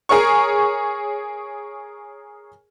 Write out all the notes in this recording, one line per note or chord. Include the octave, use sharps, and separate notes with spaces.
G#4 A#4 C#5 C#6